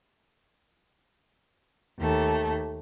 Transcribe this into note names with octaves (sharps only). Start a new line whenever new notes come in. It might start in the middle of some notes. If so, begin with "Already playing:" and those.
D#2 A3